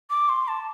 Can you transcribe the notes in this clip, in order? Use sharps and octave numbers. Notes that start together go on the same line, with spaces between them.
D6
C6
A5